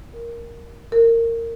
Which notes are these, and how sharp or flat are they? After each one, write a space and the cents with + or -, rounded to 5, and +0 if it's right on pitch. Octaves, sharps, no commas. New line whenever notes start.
A#4 +5
A#4 -20